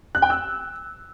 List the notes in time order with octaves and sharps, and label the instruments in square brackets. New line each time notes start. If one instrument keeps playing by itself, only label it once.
[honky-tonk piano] F#6
G5
E6